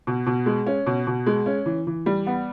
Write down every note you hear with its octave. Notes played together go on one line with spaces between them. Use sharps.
B2
B2
G#3
C#4
B2
B2
G#3
C#4
E3
E3
G3
B3